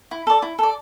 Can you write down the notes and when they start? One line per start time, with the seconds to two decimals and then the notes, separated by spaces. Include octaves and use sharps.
0.11 E4
0.27 A4 D5
0.42 E4
0.59 A4 D5